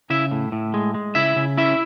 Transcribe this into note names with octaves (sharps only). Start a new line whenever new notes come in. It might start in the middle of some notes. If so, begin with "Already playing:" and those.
C#3 E4 E5
A2
A2
G#3
G#3
C#3 E4 E5
C#3
C#4 E4 E5